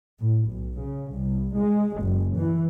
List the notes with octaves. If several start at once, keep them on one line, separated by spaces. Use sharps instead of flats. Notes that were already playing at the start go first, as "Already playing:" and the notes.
A2
B1
C#3
C2
G#3
F#1
E3